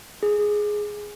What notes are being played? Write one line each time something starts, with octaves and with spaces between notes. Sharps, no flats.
G#4